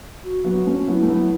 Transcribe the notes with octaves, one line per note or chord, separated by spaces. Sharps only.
F#4
F#3 B3
A3 C#4
F#3 B3 E4
A3
F#3 B3